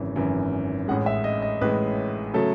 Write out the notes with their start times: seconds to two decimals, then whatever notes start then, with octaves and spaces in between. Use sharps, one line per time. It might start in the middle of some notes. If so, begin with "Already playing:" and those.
Already playing: G#1 F#2 C#3 E3
0.16 G#1 F#2 C#3 E3
0.88 A1 A2 G#3 F#5
1.06 E5
1.24 D#5
1.42 D#5
1.61 A1 A2 G#3 B4
2.34 C#3 F#3 A3 A4